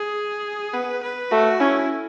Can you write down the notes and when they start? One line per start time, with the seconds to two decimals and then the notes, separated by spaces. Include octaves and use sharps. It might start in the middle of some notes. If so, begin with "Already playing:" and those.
Already playing: G#4
0.74 B3 B4
1.03 B4
1.31 A3 F#4
1.60 C#4 E4